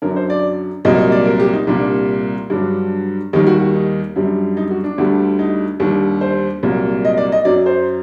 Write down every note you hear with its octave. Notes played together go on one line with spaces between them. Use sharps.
F#2 D3 F#3 A#4
C5
D5
C2 A#2 F#3 D#5
D#5
D5
A#4
G4
D#4
C2 A#2 G3 D4
G2 D3 F#3 D4
D#2 D#3 G3 D#4
F#4
F#4
D#4
F#2 D3 G3
D#4
F#4
D4
D2 D3 G3
D#4
D#2 D3 G3
C5
C2 A#2 F#3
D#5
D5
D#5
F#2 F#3 D5
C5